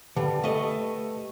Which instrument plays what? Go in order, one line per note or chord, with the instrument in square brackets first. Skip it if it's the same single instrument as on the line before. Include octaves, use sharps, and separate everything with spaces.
[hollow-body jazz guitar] D3 [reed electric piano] G4 B4 A5
[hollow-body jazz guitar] A3 D#5